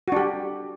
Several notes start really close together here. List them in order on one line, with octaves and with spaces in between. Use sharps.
F#4 D4 G4